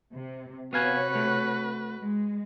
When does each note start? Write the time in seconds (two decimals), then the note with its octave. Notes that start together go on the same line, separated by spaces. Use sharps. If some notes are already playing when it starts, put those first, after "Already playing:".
0.14 C3
0.73 C3 B3 F#4 B4 C#5 F5 G#5
1.15 A3
2.01 G#3